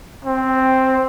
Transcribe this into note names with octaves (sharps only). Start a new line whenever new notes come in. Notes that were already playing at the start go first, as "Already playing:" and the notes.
C4